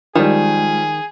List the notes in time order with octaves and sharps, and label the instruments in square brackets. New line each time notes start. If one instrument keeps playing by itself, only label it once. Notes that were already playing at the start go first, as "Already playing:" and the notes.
[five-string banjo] D#3 [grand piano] F3 G3 [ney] G#3 [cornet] G#4